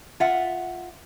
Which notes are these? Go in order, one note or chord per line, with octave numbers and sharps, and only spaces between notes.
F4 E5 F#5